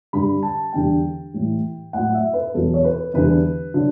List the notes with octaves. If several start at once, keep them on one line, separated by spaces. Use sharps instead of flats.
G2 D3 G3 B5
A5
E2 D3 G3 G5
A2 E3 G3
A2 F#3 F#5
E5
B4
E2 B2 F#3 A4
C#5
B4
E2 D3 G3 B4
D3 F#3